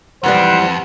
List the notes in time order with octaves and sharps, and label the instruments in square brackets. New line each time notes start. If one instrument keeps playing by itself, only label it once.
[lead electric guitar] F2 [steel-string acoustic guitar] G#2 E3 G3 [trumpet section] B4 C5 [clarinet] F#5